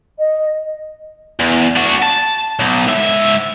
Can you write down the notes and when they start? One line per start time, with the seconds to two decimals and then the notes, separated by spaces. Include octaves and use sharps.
0.19 D#5
1.40 E2
1.76 D4 F#4
2.02 A5
2.60 B1
2.88 G#2 E5